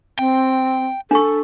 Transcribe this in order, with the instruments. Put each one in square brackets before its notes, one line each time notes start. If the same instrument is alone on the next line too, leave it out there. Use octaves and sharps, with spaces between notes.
[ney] C4 [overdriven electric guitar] G5
[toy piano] D4 C#6 [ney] A4